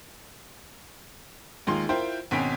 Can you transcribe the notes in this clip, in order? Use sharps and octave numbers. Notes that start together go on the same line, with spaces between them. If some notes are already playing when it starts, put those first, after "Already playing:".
D#2 G#3 D#4 F4 C6
E4 F4 A#4 C5 G5
G#1 B2 C4 C#4 B6 D7